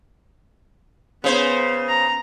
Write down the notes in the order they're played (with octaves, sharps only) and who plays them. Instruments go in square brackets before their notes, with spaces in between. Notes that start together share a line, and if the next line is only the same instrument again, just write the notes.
[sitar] C#3 C5 [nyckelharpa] B3
[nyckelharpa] A#5